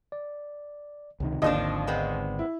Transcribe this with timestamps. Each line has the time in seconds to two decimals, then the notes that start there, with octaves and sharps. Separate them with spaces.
0.12 D5
1.20 C#2 C3 D#3
1.42 G#1 D#2 D3 F3 C4 D4 D5 D#5
1.87 G#3 B3 C4
2.39 E4